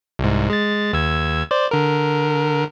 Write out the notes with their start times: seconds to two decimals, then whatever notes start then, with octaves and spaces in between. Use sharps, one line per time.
0.19 C2 G#2
0.50 G#3 A6
0.93 D#2 E6 G#6
1.51 C5 D5
1.71 D3 A#4